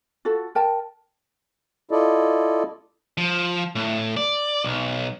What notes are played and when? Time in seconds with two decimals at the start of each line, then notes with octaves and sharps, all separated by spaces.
0.25 F4 F#4 A4
0.55 A#4 G5 A5
1.91 E4 F4 A4 D5 D#5
3.18 F3
3.75 A2
4.17 D5
4.64 B1